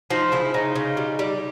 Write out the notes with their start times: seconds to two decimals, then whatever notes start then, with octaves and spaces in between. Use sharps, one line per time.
0.11 F3 D#4
0.32 C#3 E4
0.54 C#3 D#4
0.76 C#3
0.97 G3
1.19 G3